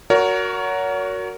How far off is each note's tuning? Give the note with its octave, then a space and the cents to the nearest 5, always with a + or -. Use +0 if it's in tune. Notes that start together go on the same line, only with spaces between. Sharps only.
F#4 +0 A#4 +0 C#5 +35